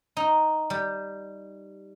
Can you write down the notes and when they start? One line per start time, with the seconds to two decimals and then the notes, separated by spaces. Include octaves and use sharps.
0.17 D#4
0.70 G3